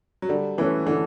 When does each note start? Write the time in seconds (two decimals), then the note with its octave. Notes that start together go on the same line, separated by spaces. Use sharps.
0.22 F#3
0.29 D3 G3
0.58 E3 A3 C#4 E4 B4
0.87 D3 E3